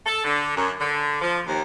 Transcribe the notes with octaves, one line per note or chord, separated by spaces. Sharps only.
A4
D3
F#2
D3
F3
D#2